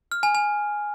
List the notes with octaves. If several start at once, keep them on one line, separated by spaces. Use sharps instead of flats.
F6
G#5
G#5